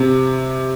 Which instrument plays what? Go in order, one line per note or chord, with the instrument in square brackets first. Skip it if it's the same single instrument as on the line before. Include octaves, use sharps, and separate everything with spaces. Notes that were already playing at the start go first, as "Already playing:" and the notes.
Already playing: [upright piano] C3